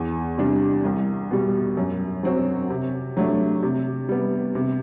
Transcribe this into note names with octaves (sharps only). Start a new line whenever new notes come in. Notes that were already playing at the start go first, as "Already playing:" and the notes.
Already playing: E2
C3 G3 D4
C2
B2 G3
F#2
F#3 C4 F#4
C3
F#3 A3 D4
C3
G3 B3
C3